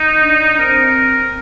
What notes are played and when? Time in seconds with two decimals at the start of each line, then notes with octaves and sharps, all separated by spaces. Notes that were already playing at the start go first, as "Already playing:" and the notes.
Already playing: D#4
0.21 D4
0.58 C4 A#4